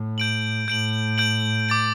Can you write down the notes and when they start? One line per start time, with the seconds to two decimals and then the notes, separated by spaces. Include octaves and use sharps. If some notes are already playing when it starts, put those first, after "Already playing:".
Already playing: A2
0.18 G6 D7 F#7
0.68 A2 G6 D7 F#7
1.18 G6 D7 F#7
1.69 D6 A6 D7